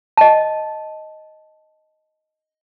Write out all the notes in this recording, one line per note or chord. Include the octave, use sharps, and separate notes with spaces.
D#5 A5